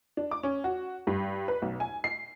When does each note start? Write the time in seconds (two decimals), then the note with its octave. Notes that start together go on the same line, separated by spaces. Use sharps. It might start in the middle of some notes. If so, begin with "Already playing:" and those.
0.17 D4
0.31 D6
0.43 C#4
0.64 F#4
1.07 G2
1.48 B4
1.62 B1
1.80 G#5
2.04 C7